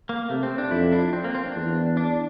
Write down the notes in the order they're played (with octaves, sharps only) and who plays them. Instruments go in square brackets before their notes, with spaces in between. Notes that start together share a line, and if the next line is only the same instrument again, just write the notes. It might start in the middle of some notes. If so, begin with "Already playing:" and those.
[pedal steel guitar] A#3
[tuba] C3 [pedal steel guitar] A3
[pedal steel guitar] C4
D4
[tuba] F2 [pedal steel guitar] E4
[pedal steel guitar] D4
C4
A#3
C4
D4
[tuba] E2
[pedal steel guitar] D4